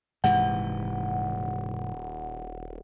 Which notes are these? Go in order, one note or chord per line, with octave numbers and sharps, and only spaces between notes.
D#1 G#2 C3 E3 F#5